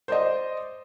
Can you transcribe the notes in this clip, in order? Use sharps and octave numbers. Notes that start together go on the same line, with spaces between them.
C5 D5 D#5